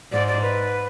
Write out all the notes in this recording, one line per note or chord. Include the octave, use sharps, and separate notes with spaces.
G#2 D5
D5
B4